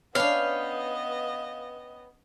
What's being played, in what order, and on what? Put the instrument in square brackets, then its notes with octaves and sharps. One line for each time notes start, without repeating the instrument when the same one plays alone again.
[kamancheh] B3 D#5 [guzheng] C#4 D4 [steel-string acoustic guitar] B4 C#5 G5 [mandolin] F5